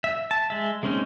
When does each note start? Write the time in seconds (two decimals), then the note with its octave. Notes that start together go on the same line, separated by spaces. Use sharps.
0.04 E5
0.31 A5
0.50 G#3 E5
0.83 G#3 A#3 C4 C#4 D#4